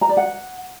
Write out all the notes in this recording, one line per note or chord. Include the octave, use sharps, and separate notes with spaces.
A#5
D5
F#5